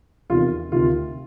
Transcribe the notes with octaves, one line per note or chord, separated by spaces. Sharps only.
E2 C3 D#3 F4
D2 C3 D#3 F4